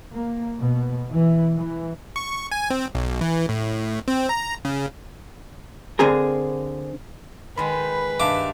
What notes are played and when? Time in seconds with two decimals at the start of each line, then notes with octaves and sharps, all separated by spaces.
0.11 A#3
0.60 B2
1.11 E3
1.55 E3
2.16 C#6
2.51 G#5
2.70 C4
2.95 B1
3.21 E3
3.49 A2
4.08 C4
4.29 A#5
4.65 C#3
5.99 D3 C4 G#4 A#4
7.57 D#3 G#3 B4 B5
8.20 G2 D#3 E5 F5 A5 D6